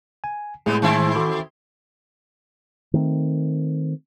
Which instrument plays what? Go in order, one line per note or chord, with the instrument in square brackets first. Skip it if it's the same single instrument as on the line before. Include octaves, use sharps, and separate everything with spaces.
[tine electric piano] G#5
[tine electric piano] A2 G#3 G#4 [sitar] C3 B3
[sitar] D#3 C4 E4
[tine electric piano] F#4 A4 D6
[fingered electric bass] D#3 A3 C4